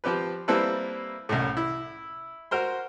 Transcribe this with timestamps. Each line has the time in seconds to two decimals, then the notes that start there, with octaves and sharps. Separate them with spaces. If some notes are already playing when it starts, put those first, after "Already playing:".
0.04 F3 C4 G4 B4
0.48 G3 A#3 C4 E4 A4 B4
1.29 C2 F#2 A2
1.57 E4
2.51 F#4 A#4 C5 C6